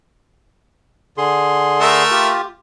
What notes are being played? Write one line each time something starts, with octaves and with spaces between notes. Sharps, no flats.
D3 G#4 C6
A3 A#4 E5
F4 G4